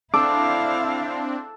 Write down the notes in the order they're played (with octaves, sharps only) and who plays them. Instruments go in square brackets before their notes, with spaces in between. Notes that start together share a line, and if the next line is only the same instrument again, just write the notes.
[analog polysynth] C4 D4 [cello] E4 F5 [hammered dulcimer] A4 [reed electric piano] D6